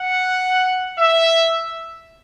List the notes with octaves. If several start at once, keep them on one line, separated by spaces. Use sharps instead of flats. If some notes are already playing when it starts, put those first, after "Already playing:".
Already playing: F#5
E5